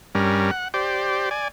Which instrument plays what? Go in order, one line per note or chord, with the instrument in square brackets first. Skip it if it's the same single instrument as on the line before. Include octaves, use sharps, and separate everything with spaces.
[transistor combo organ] G2 G3 C#4 A#4
F#5
G4 C5 D5
D5 G#5